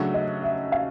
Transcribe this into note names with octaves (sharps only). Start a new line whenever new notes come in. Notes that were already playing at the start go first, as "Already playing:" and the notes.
Already playing: C#3 F#3 A3 D4 F#4
D#5
E5
F5